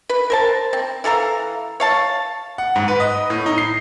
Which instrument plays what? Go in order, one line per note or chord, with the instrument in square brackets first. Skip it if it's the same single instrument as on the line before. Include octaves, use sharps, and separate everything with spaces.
[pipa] B4
A#4 C5 A5
C4
E3 A4 F5 A#5
C#5 F5 A5
[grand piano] F#5
G#2
B4
D#5
A2
D#4
C7